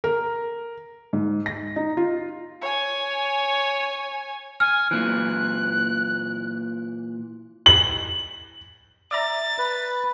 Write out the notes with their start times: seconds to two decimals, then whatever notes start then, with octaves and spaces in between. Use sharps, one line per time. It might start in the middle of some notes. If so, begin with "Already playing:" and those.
0.04 A#4
1.13 G#2
1.46 A#6
1.76 D#4
1.97 F4
2.62 C#5 G#5
4.60 G#5 F6
4.91 A#2 E3 F#6
7.66 F#7
9.11 D5 E5 A#5 A6
9.59 B4